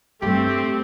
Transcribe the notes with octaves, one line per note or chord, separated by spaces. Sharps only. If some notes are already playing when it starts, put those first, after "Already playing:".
G2 G3 A3 C4 G4